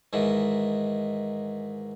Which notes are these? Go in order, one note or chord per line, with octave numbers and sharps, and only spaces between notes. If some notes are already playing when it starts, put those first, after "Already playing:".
G#2 D#3 E3